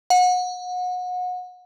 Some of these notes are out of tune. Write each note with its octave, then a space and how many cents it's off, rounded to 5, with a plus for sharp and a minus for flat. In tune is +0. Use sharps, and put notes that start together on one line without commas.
F#5 -30